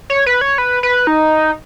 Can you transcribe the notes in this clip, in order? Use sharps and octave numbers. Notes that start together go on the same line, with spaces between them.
C#5
B4
C#5
B4
B4
D#4